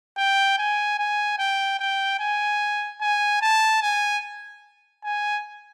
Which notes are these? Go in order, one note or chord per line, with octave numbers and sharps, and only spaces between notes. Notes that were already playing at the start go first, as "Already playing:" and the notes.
G5
G#5
G#5
G5
G5
G#5
G#5
A5
G#5
G#5